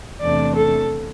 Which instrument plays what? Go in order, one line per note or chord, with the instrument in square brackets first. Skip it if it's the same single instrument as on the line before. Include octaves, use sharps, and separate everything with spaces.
[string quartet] E2 C3 A3 D4 D5
A4